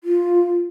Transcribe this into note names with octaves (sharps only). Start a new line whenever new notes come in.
F4